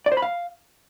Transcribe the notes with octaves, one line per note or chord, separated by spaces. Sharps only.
D5
C5
B5
F5